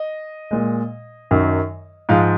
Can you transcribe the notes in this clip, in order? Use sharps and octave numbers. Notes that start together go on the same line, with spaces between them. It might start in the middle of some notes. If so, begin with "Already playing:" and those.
Already playing: D#5
A#2 G#3
F#2 D#3 F#3
G#2 F3 G#3 F5